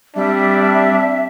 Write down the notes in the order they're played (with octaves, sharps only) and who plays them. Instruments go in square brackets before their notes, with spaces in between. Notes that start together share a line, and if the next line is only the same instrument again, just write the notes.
[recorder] G3 [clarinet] C4 [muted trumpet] D4 [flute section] E5